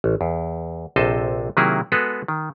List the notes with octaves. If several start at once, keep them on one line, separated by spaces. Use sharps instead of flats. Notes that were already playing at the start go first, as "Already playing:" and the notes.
A1
E2
A#1 C3 A4 C5 D#5 A5
C3 D#3 F#3 A#3 E4 G#4
G#3 B3 F#4 G#4 A4 B4
D#3